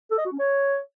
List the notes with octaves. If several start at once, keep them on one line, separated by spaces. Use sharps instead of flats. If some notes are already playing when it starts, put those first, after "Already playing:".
A4
D#5
F#4
C#4
C#5